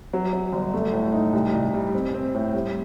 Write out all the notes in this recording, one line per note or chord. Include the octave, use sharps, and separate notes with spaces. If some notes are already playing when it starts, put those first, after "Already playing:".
F#3
F#3
G1
A3
A2
D#4
C2
C2
G3
C4
C4
A2
G3